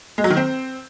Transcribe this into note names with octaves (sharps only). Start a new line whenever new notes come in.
G#3
F#3
D#3
C4